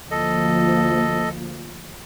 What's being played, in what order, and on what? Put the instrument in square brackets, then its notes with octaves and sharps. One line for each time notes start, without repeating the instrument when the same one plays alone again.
[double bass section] D2 F3 A#3 [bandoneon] A4 D#5